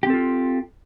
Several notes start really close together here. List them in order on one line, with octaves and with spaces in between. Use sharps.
G4 C4 A4 F4